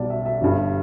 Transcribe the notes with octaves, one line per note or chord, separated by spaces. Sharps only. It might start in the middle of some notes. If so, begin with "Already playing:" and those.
Already playing: B1 B2 G3 D5 A5
E5
E5
G1 G2 G3